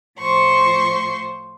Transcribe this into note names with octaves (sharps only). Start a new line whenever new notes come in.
A2 F3 C5 C6 C#6